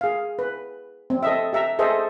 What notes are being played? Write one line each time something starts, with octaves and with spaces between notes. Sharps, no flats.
G#4 F5
B4
C4
A4 D#5 E5
G4 E5 A#5
G#4 A4 C5 D#5 E5